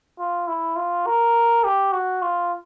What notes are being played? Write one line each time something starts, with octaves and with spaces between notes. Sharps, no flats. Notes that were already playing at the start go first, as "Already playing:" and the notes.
F4
E4
F4
A#4
G4
F#4
F4